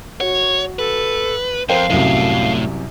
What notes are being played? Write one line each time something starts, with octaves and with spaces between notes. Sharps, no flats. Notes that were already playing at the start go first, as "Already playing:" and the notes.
F#4 C#5
A4 B4
F2 A#4 C5 F5 G5
C2 F#2 A2 C3